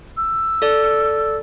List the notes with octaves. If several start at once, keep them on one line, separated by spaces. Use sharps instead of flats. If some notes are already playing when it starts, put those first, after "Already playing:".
E6
A4 D5